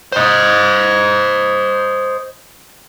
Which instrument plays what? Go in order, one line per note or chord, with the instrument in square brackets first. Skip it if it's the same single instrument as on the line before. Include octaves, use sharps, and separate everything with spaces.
[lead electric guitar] C5 D#5